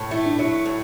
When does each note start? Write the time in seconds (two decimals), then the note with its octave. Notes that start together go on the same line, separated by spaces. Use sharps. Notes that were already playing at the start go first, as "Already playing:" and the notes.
Already playing: A2
0.11 A3 E4
0.26 D4
0.39 F#3 E4
0.66 A2